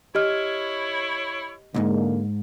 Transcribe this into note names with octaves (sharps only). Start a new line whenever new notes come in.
E4 G4 C#5 D#5 F6
B1 G#2 D3 G#3 A#3